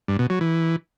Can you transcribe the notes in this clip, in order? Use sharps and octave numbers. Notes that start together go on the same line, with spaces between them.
G2
B2
F#3
E3